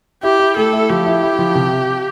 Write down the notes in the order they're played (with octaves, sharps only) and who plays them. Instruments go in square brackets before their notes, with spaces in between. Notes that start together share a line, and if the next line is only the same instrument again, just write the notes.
[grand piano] E4 [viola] G4
[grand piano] E4
[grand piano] A3 [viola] A4
[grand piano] E4
[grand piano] F3 [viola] G4
[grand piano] E4
E4
F3
C3